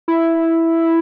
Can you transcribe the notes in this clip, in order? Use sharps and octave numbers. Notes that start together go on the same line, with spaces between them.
E4